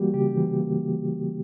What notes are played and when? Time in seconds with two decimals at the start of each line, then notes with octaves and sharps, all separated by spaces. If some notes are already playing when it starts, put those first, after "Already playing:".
Already playing: E3 G3 A#3 F#4 G4
0.14 C#3 G4
0.37 E3
0.60 A#3